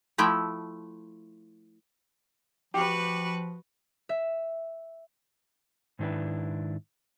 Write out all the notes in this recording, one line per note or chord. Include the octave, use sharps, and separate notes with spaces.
F3 A3 E4 G5
F3 F#4 G4 B4
E5
G#2 D#3 D4 E4 B4